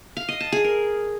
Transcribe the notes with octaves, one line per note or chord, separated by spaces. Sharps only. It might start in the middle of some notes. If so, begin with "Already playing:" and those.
F5
D#5
A5
G#4
A#4